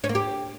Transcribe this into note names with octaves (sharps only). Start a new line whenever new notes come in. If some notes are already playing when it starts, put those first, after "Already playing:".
C#4
A#3
G4